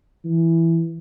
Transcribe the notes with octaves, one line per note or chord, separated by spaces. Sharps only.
E3